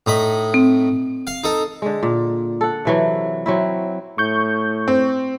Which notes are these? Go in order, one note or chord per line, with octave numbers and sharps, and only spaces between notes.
A2 D#4 B5
C4
F5
D#4 A4
D3 G#3
A#2
A4 F#5
C3 E3 F#3
F#3 C4 E4
A2 C#6 G6
C4